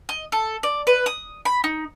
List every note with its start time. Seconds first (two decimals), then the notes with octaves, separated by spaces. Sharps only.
0.09 D#5
0.32 A4
0.63 D5
0.87 B4
1.06 D#6
1.45 B5
1.64 D#4